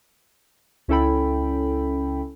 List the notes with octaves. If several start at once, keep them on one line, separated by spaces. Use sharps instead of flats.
C#2 C#4 E4 A4 G5 B5